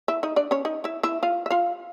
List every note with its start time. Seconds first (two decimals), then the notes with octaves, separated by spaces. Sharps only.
0.08 E4 E5
0.23 D#4 D#5
0.36 D4 D5
0.51 C#4 C#5
0.65 D#4 D#5
0.84 E4 E5
1.03 E4 E5
1.23 F4 F5
1.46 E5
1.50 F4 F5